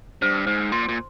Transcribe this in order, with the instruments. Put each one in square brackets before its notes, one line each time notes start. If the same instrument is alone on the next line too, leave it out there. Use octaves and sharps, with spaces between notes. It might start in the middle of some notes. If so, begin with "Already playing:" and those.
[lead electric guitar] G2 [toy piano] C5
[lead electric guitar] G#2 [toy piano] C5
[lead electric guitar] A#2 [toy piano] C6
[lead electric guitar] A#2